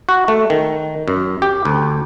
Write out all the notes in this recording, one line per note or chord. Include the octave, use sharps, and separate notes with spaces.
F#4
A3
D#3
F#2
G4
D2